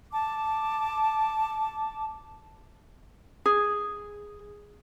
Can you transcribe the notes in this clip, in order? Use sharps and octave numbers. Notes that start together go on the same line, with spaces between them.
A5 D6
G#4